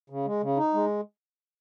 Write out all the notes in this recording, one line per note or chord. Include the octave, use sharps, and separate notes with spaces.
C#3
G#3
C#3
D#4
G#3